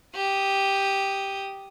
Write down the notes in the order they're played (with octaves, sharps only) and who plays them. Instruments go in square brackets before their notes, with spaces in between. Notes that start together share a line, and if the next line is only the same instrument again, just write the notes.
[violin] G4 D#6